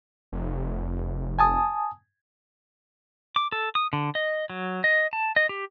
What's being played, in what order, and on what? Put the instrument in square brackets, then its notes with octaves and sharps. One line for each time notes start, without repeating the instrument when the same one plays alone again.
[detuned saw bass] F1
[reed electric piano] G#5 A5 D#6
[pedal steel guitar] D6
A4
D#6
D3
D#5
F#3
D#5
A5
D#5
G4